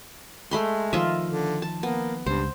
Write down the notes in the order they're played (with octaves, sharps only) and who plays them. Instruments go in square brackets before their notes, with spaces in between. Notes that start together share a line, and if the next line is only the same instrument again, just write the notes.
[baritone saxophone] G#3 [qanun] A3 B5 C6
[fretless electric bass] D#3 F3 [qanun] F4 D#5 E5
[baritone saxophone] D3
[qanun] A5
[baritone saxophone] A#3 [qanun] B3
[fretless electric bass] C#2 [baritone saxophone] G2 [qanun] C5